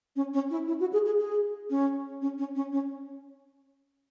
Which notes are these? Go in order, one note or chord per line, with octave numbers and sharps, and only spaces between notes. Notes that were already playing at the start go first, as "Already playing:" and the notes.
C#4
C#4
E4
E4
F#4
G#4
G#4
G#4
C#4
C#4
C#4
C#4
C#4